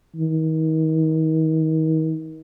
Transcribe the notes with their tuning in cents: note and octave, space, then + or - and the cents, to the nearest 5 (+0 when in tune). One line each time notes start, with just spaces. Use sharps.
D#3 +35